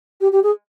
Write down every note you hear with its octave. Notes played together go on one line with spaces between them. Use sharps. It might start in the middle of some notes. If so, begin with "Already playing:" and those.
G4
G4
G#4